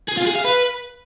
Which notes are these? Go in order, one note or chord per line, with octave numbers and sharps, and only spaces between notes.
G#4
F4
G#4
F5
B4